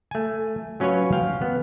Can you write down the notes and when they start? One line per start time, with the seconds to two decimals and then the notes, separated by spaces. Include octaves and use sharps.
0.11 A3 G#5
0.80 F#3 C#4 F4 B4 C#5
1.13 F5 G5
1.42 B3